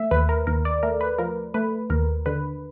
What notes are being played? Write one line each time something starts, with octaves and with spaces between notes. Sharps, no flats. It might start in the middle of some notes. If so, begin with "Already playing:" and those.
Already playing: A3 E5
D#2 B4
A#4
D#2 A#4
D5
A3 A#4
B4
F3 A#4
A3 B4
D#2 A#4
D3 B4